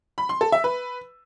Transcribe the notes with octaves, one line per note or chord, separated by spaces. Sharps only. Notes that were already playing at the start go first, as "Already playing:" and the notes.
B5
C6
A4
E5
B4